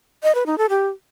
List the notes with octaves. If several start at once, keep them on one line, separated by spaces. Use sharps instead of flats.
D#5
B4
D#4
A4
G4